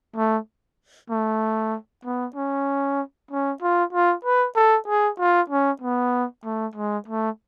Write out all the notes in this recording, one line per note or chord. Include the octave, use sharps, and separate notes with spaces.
A3
A3
B3
C#4
C#4
F4
F4
B4
A4
G#4
F4
C#4
B3
A3
G#3
A3